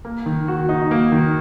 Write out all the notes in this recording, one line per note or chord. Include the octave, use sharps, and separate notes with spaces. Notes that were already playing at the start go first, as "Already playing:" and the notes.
A#3
D#3
F#4
D#4
A#3
D#3